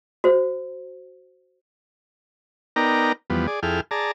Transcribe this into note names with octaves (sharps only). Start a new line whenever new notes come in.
F#4 C5
B3 D#4 A#4 D5 G5 A#5
E2 F3 G3 B3
G#4 D5
F2 E4 G#4 A4 G5 F6
G#4 D5 A5 A#5